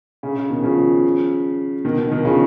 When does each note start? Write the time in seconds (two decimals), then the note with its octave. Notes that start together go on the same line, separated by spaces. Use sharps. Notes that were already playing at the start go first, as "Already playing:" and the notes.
0.23 C#3
0.36 C#3
0.50 B2 D#3
0.63 C#3 F3
1.85 B2 D#3
1.98 B2 D#3
2.11 B2 D#3
2.25 C#3 F3